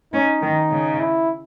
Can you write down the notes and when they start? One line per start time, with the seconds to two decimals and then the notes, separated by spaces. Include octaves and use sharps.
0.13 C#4 D#4
0.42 D#3
0.71 C#3
1.00 E4